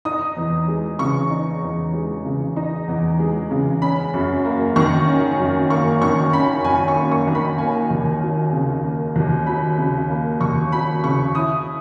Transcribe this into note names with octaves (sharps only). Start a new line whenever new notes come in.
D#4 D#6
E2
G#3
C#3 C#6
D#4
E2
G#3
C#3
D#4
E2
G#3
C#3
C#4 B5
F#2
A#3
D#3 C#6
C#4
F#2
A#3 C#6
D#3 C#6
C#4 B5
F#2 G#5
C#6
A#3
C#6
D#3
B5
A#3 G#5
D#2
F#3
C#3
A#3
D#2
F#3 B5
C#3
A#3
D#2 C#6
F#3 B5
C#3 C#6
E4 D#6